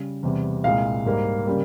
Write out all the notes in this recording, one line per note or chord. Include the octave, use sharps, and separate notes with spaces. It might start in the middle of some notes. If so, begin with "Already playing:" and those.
Already playing: C#3 G3
E2 C3 G3
C2 A#2 G#3 F5
G#2 G3 A#3
C#3 G3 A#3